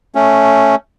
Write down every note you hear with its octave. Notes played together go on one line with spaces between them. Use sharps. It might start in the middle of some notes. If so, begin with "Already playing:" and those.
A3 C#4